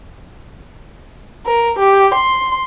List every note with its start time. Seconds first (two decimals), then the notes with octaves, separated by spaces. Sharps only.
1.45 A#4
1.77 G4
2.14 C6